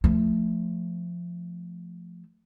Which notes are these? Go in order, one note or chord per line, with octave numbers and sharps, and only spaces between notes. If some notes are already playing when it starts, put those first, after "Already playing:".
F3 A3